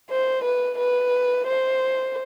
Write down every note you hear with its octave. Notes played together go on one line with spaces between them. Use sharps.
C5
B4
B4
C5